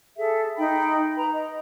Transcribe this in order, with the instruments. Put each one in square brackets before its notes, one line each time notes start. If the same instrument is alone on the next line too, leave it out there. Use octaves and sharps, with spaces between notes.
[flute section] G#4 A4 E5
D#4 G5 B5
B4 A#5 B5
D#5